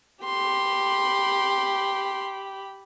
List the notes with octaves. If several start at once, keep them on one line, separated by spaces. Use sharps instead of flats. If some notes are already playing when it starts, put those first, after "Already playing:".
G4 B5 C6